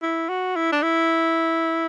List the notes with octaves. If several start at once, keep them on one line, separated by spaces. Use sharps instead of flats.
E4
F#4
E4
D4
E4